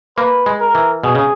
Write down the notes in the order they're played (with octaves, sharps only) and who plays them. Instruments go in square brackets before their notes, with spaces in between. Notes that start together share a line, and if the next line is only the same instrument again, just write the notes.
[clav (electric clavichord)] A#3 [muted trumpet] B4
[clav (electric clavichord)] G#3
[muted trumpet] A#4
[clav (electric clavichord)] E3
[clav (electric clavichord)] B2 [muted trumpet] G#4
[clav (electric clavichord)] C#3